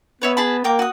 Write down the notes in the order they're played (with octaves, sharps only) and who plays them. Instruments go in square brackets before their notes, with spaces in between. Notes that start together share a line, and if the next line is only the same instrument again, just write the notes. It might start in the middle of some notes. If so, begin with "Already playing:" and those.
[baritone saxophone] B3 [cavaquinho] B4 C#5 E5
[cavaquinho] G#4 A5 B5
[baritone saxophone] A#3 [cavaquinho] A#4 G5 D6
[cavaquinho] F#4 D#6